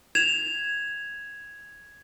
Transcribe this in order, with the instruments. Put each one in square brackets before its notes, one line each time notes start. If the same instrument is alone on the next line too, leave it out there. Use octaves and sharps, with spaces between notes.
[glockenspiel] G#6 E7 F7